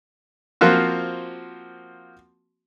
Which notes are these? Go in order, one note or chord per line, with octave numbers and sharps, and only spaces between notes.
F3 A#3 C4 F4 F#4